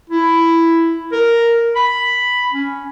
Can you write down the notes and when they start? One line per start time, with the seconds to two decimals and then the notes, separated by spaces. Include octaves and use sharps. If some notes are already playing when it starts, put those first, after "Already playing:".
0.10 E4
1.12 A#4
1.76 B5
2.52 C#4